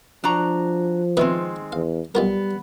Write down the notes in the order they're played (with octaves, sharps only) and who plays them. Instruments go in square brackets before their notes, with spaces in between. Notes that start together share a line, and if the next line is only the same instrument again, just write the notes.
[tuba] F3 [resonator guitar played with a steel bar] D4 F#4 A#5
[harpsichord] B2 B4 E5 [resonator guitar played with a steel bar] D#3 G#3 C4
[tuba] E2 [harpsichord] F5
[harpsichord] B1 F4 A#4 [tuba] G3 [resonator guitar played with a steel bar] B3